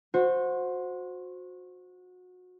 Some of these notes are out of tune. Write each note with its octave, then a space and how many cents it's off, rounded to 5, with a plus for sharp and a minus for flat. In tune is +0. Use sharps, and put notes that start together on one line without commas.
F#4 -25 C5 +0